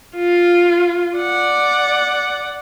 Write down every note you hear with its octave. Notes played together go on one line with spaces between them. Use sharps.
F4
D5 F#5